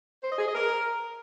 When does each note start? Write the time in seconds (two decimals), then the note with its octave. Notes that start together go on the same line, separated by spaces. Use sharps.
0.22 C5
0.30 D#5
0.38 G#4
0.46 D#5
0.54 A#4